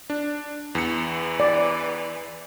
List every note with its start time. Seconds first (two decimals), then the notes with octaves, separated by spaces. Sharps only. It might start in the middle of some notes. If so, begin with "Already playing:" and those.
0.10 D4
0.75 E2 E3 C#7
1.40 D5